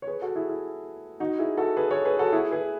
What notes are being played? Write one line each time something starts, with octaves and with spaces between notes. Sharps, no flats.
C#5
G#4 B4
F#4 A4
E4 G#4
E4
D#4 F#4
E4 G#4
F#4 A4
G#4 B4
A4 C#5
G#4 B4
F#4 A4
E4 G#4
G#4 B4